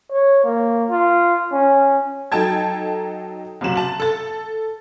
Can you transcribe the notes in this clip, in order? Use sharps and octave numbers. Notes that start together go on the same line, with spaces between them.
C#5
A#3
F4
C#4
F#3 D#4 A4 G5 A5 G#6
F#1 C3 F#3 E7 F#7
A5 F#7
A4 A6